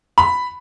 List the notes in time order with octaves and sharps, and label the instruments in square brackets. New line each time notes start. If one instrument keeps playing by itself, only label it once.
[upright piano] B5